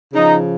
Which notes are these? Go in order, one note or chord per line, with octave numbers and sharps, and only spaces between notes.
C#3 F3 D#4